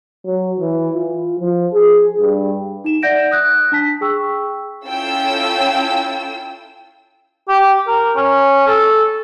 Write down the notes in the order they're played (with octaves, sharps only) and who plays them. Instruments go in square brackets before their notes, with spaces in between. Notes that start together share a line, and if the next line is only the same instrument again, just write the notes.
[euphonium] F#3
E3
F4
F3
G#4
G2
[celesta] D#4 E7
D5 E5 F#5 G6 A#6 D7
D#6 F#6 G#6 A#6
D4 A5 B6
G#4 G5 C#6 E6
[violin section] C#4 E4 F4 A4 G5 E6
[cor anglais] G4
A#4
C#4
A4